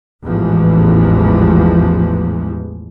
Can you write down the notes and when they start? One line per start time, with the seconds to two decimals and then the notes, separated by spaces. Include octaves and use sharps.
0.24 A1 E2 G#2 E3 F3 G#3